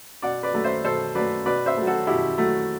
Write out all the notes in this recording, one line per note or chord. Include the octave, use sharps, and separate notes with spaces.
B2 D5 F#5
B4 D5
F#3 A3
C5 E5
B2 A4 C5
F#3 A3 B4 D5
B2 B4 D5
C5 E5
F#3 A3
F#4 A4
B2 E4 G4
F#3 A3